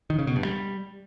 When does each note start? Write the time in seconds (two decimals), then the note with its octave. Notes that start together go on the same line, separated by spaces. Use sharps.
0.10 D#3
0.19 C#3
0.27 B2
0.36 G2
0.45 G3